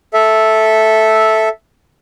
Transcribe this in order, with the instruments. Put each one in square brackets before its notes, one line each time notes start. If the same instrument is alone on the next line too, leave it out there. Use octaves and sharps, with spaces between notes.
[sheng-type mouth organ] A4 E5